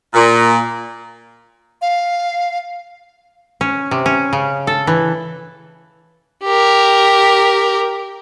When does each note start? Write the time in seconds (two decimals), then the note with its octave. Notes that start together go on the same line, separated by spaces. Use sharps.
0.13 A#2
1.82 F5
3.61 C#4
3.91 C3
4.06 C#4
4.33 C#3
4.67 A4
4.87 E3
6.45 G4 A#4